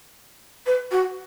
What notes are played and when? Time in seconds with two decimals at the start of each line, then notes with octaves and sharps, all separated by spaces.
0.66 B4
0.91 F#4